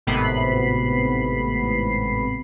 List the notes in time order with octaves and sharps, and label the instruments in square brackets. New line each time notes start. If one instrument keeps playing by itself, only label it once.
[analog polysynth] G#1 A2 C3 B3 B5 C7